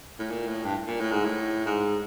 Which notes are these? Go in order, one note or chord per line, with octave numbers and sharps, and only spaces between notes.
A2
A#2
A2
G2
A#2
A2
G#2
A2
G#2